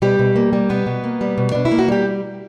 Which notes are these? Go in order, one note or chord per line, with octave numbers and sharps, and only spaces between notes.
B2 G3 G4
B2
A#3
G3
B2 B3 B4
B2
A#3
G3
B2
B2 D4
E4
A#3
F#4
G3 G4